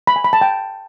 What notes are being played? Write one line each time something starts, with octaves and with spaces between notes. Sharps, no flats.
B5
G#5
B5
A5
G5